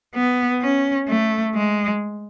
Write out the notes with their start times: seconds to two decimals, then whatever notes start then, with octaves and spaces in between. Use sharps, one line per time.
0.15 B3
0.62 C#4
1.09 A3
1.55 G#3